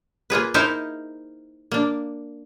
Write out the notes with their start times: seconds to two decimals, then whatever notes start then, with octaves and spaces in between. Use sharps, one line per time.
0.30 A#3 F4 G#4 B4
0.54 D#4 E4 G#4 A#4 C5 F5
1.72 A#3 D4